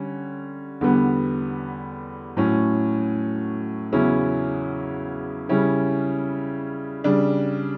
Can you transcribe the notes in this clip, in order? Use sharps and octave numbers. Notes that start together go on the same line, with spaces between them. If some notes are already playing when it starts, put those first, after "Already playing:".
Already playing: D3 G3 C#4
E2 D3 G3 B3
A2 F#3 C#4
E2 C#3 F#3 C#4 E4
C#3 G3 C#4 E4
C#3 G3 D4